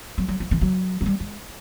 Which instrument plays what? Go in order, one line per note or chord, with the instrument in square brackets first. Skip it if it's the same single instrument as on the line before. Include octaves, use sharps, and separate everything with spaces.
[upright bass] F#3
F#3
F3
E3
F#3
F#3
G3
G#3